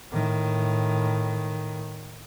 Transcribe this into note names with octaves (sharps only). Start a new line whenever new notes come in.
A2 D#3